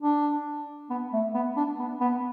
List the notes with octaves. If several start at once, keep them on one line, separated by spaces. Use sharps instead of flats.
D4
B3
A3
B3
D4
B3
B3